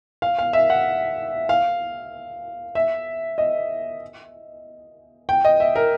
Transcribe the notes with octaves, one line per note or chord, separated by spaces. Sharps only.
F5
F5
E5
F#5
F5
E5
D#5
G5
D#5
E5
A#4